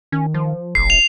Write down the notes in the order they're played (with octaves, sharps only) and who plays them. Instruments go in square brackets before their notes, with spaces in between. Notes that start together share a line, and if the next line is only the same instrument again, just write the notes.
[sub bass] D#3 [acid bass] C#4
[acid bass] F3
[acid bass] E1 [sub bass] A1 [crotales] C7
[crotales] F7